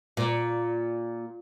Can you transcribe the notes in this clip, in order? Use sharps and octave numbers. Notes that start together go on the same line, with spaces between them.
A#2